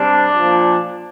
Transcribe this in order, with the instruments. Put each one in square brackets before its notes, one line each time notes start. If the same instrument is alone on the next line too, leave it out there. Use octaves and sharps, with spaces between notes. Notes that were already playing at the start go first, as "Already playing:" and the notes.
Already playing: [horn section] C3 G3 D4
A#2 F3